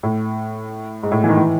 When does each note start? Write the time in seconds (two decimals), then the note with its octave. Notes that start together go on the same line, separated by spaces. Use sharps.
0.03 A2
1.03 G#2
1.12 A2
1.24 E3
1.28 D#3
1.37 E3